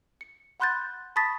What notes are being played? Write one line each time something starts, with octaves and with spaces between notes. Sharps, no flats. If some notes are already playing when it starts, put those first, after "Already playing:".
C#7
F#5 B5 C6 F#6 G6 A6
A5 B5 C#6 D#6 A6 B6